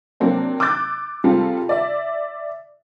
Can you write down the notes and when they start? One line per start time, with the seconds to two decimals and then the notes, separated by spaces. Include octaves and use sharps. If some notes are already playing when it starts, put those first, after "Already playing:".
0.20 C3 F#3 A#3 C4 D4
0.60 D6 E6 F#6 G6 A6
1.24 C3 G3 C4 F4 G#4 A4
1.69 D5 E5